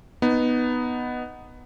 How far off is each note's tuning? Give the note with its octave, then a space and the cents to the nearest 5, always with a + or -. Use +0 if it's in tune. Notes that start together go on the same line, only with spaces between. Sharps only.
B3 +0 D#4 -5